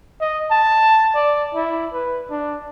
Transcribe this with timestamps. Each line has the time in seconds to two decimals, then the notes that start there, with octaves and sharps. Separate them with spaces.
0.21 D#5
0.51 A5
1.15 D5
1.55 E4
1.93 B4
2.31 D4